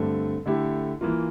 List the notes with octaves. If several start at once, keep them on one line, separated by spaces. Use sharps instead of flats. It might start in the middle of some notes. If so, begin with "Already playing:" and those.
Already playing: G2 D3 A3 C4
D3 A3 E4 G4
E3 A#3 F4